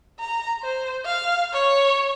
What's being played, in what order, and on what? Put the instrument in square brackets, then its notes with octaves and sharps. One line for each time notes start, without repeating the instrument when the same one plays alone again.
[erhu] A#5
C5
F5
C#5